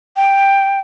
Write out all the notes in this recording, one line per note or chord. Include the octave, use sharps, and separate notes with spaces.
G5